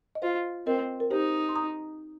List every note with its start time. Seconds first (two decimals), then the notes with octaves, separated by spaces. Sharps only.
0.15 D#5
0.22 F4 C5 F5
0.66 C4 A#4 D#5
1.00 A#4
1.11 D#4 G4 C5
1.49 C6
1.56 A#5 D#6